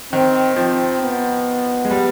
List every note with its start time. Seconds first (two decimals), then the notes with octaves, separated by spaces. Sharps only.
0.13 D#3 C4
0.57 F3 C4
1.02 B3
1.85 G#3
1.91 G3